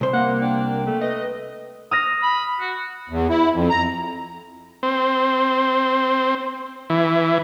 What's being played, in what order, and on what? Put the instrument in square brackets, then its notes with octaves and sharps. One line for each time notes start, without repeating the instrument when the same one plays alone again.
[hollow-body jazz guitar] C2 C5
[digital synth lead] A#3 [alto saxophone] F#5
[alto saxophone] D4 [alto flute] G5
[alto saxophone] A3
[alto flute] B4 [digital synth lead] D#5
[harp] D#6 F6 A#6
[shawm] B5
F#4
[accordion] E2
E4
F2
A#5
[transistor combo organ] C4
E3